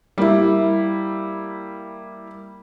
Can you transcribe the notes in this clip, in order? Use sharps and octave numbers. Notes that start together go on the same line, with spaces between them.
G3 A#3 E4